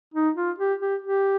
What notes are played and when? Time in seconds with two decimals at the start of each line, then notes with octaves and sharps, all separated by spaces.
0.14 D#4
0.36 F4
0.58 G4
0.80 G4
1.02 G4